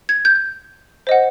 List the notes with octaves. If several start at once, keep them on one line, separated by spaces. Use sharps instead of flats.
G#6
G6
C5 D#5 F#5